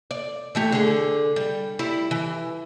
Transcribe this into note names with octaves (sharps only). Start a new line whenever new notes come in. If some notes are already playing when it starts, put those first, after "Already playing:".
D5
E3 A3 G4
D3 G#4
G3
G3 E4
E3